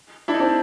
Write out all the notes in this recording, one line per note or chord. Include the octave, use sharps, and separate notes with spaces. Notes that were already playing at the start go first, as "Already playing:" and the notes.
D4 E4
D#4
C4 D4